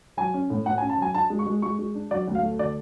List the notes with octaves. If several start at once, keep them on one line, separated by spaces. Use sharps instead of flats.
F#3 G#5
C#4
A2
A2 F#5
G#5
C#4
A5
F#3 G#5
D4 A5
G#3
C#6
G#3
G#3 C#6
G#3
D4
F#3 D5
D2
F5
A3
D3 D5